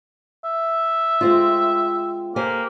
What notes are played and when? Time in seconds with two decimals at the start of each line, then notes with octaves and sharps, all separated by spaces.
0.45 E5
1.21 G#3 C4 F4
2.36 A#3 G4 C5 G#5